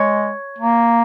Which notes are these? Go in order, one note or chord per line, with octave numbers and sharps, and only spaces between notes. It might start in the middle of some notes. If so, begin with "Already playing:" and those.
Already playing: G#3 C#5
A#3